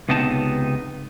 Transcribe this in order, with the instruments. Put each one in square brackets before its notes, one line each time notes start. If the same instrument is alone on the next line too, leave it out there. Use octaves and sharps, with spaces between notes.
[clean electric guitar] C#2 C3 B3 D#4 A5